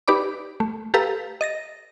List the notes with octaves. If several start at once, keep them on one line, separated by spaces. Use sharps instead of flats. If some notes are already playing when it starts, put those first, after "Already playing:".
D#4 G4 B4 D5 B5 D6
A3
G4 A4 B4 F5 A#5 E6
D#5 A6 A#6